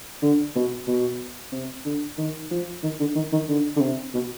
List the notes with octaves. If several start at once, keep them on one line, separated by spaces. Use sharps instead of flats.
D3
B2
B2
C3
D3
D#3
F3
D#3
D3
D#3
D#3
D3
D3
C3
B2